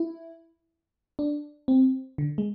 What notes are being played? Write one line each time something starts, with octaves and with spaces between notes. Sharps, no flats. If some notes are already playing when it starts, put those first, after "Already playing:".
Already playing: E4
D4
C4
D3
G#3